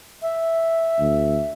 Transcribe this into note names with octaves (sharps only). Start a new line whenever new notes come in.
E5
D2